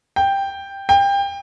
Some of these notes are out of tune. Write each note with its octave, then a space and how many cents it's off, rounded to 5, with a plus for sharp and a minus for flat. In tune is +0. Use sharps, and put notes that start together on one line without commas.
G5 +5
G5 +25